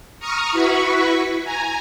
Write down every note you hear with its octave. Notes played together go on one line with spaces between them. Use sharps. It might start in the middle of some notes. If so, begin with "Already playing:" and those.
A#5 C#6 D#6 F6
E4 F#4 B4 B5 C#6
G#5 A#5